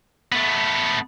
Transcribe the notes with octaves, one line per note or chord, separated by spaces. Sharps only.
A3 B3